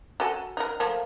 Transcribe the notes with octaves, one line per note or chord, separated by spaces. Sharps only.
F#4 A4 G#5
D#4 A#4
F3 A3 A#3